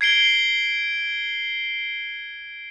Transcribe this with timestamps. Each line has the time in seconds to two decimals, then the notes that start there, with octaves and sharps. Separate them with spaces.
0.01 G#6 C7 D7 G7